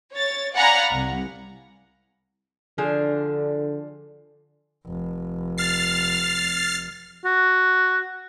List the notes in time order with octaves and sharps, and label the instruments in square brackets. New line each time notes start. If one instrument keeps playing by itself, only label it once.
[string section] C#5 A6
D5 F5 F#5 G#5 A#5 B5
C2
[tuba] D3 [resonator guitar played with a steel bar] F3 D4 G#4
[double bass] F1
[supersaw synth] F6 A6 C7
[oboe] F#4